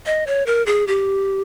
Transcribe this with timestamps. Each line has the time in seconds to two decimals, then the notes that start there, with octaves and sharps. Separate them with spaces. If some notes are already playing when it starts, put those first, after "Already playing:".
0.06 D#5
0.27 C#5
0.46 A#4
0.66 G#4
0.87 G4